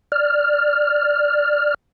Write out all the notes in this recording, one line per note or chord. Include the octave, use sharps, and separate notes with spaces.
D5 F6